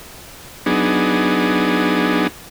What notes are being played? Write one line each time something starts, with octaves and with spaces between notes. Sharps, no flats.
F#3 B3 D4 D#4 G#4